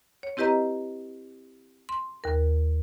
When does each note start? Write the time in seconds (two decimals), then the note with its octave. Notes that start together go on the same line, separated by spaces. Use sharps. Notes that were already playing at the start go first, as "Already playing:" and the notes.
0.23 C#5
0.37 C4 E4 G4 B4 D#5 A#5
1.89 C6
2.24 D#2 A#4